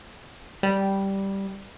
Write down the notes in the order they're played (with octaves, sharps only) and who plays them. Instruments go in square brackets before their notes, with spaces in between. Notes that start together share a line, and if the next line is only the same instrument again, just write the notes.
[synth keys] G3